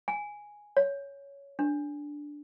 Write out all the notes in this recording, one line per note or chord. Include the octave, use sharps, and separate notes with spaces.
G#5
C#5
D4